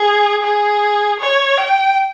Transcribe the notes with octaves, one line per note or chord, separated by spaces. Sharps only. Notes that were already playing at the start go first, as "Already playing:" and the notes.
Already playing: G#4
G#4
C#5
G5